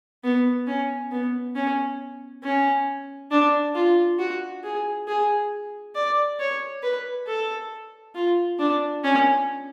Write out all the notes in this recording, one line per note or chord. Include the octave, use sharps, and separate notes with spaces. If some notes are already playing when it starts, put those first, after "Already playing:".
B3
C#4
B3
C#4
C#4
D4
F4
F#4
G#4
G#4
D5
C#5
B4
A4
F4
D4
C#4